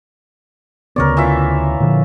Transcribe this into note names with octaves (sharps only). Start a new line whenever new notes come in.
D2 C#3 B3 A#4 C#5 D5
E3 F4 E5
A#2 D3 F3